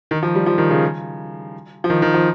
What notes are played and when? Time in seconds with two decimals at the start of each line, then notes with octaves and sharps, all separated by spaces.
0.11 D#3
0.23 F3
0.35 G3
0.46 F3
0.58 D#3
0.70 C#3
1.84 F3
1.90 D#3
2.02 D#3
2.14 F3